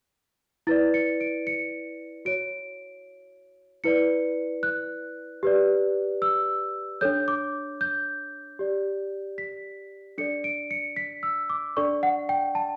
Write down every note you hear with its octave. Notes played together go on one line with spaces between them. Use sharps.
E4 B4 D5 A6
C#7
D7
C#7
F#4 C#5 D7
E4 B4 D5 C#7
F#6
G4 B4 D5
E6
D4 A4 C#5 G6
D6
G6
G4 D5
B6
D4 A4 D5 C#7
D7
C#7
B6
E6
D6
D4 A4 D5 C#6
F#5
G5
A5